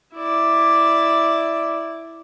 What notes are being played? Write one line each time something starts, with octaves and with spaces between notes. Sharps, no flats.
E4 D5